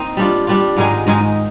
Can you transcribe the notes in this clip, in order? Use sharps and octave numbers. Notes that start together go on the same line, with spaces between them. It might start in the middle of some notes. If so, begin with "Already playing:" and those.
Already playing: A#3 C4 D#4
G3 D4 F4
G3 D4 F4
G#2 D#3 G#3 D#4
G#2 D#3 G#3 D#4